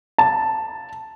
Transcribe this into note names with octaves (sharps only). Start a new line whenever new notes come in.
A5